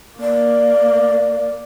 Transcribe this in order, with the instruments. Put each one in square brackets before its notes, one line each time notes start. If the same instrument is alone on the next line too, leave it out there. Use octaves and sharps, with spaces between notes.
[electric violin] A#3 [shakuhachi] D5